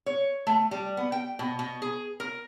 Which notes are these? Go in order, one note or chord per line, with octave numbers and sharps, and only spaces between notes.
C#5
A3
G3
B3
G5
B2
B2
G#4
A#4